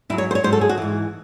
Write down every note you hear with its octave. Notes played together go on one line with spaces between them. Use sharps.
G#2 F#3 E4
C#5
C5
C#5
G#2 F#3 C5
A4
G#4
F#4
G#2 E3